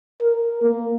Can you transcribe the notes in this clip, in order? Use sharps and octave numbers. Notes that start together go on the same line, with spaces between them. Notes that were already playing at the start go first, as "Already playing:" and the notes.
A#4
A#3